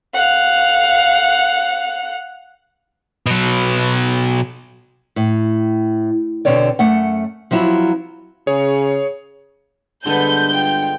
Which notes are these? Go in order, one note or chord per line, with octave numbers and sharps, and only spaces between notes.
F5 F#5
B2 F#3
A2
B2 D3 C4 C#5 D5
F#2 A3 F#5
F3 F#3 C4 E4 F4
C#3 G#4 C#5
G2 D3 G#3 B3 A4 B4 G6
F4 G5